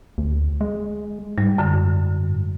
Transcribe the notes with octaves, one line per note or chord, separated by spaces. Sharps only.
D2
G#3
G#2 G3
F#2 D3